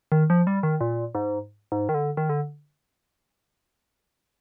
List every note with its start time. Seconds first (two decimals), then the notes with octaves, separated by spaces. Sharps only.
0.12 D#3
0.30 F3
0.47 G3
0.63 D#3
0.81 A#2
1.15 G#2
1.72 G#2
1.89 D#3
1.94 D3
2.17 D#3
2.29 D3